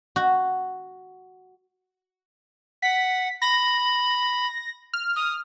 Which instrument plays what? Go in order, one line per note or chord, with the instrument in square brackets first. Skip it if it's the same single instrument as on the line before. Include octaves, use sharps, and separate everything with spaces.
[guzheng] F#4
[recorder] F#5 [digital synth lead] B6
[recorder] B5 [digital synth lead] A#6
[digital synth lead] F6
[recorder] D#6